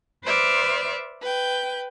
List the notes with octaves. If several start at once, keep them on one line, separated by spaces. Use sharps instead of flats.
B4 C5 D5 E5 F6
B4 G5